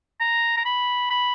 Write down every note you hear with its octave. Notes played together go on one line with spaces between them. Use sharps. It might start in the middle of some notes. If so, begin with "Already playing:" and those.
A#5
A#5
B5
B5